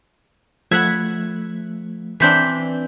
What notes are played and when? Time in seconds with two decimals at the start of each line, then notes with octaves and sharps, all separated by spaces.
0.71 F3 A3 E5 F#5 B5 F#6 G#6
2.20 E3 C4 D4 G6 B6